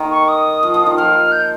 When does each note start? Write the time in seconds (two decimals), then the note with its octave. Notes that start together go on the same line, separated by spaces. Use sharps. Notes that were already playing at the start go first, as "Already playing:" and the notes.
Already playing: D#3 A#3
0.11 C#6
0.28 D#6
0.63 F3
0.74 F3
0.86 D#3
0.97 F3 F6
1.32 G6